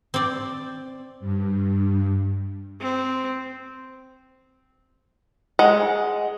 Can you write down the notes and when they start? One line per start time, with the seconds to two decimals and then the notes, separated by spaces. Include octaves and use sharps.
0.14 C4 D5
1.20 G2
2.81 C4
5.59 G#3 F#5